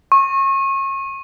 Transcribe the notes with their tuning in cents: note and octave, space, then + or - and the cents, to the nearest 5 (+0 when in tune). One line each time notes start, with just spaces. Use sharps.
C#6 -30